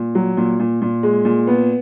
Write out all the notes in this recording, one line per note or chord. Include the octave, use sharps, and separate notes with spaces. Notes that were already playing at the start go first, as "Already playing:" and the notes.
Already playing: A#2
F#3
A#2
A#2
A#2
G#3
A#2
B3